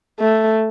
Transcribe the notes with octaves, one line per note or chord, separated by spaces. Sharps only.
A3